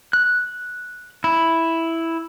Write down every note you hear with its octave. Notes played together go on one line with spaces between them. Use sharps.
F#6
E4